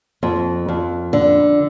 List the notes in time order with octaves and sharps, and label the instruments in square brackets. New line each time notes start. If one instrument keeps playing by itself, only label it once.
[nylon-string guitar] F2
F2
D3